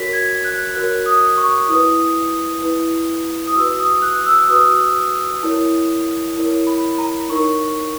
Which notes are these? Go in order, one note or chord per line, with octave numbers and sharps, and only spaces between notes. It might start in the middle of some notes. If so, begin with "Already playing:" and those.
Already playing: F#4 A#4 C#5 B6
G#6
F#6
F#4 A#4 C#5 F#6
D#6
C#6
E4 B4 D#6
E4 B4
D#6
F#4 B4 E6
D#6
F#6
E6
F#4 B4 D#6
E4 A#4 C#5
E4 A#4 C#5
B5
A#5
D#4 A#4 C#5 C#6